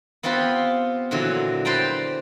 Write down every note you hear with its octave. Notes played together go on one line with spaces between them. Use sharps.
B3 C4 F4 G4 B4
A#2 D3 E3 F#3
B4 C5 D5 G5 A#5